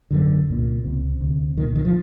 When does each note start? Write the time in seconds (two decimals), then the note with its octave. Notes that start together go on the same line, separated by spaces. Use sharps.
0.11 G#1 F#2 D3
0.47 C2 A#2
0.84 C#2 C3
1.21 D2 C3
1.58 C2 A#2 D#3
1.76 D#3
1.85 F3